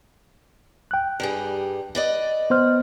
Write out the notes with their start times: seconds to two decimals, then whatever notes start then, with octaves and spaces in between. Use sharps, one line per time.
0.91 G5 F#6
1.20 G2 G3 G#4
1.95 B4 D5 D#5
2.50 B3 C5 F6